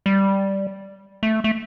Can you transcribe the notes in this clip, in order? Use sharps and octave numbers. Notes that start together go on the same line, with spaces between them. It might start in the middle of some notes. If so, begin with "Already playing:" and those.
G3
A3
A3